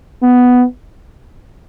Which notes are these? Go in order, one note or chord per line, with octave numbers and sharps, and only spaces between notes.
B3